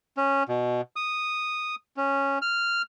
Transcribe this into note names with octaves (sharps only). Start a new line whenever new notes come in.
C#4
B2
D#6
C#4
F6